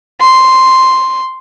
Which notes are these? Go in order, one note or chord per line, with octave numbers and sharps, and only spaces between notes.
C6